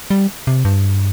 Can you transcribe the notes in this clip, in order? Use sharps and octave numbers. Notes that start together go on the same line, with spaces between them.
G3
C3
G2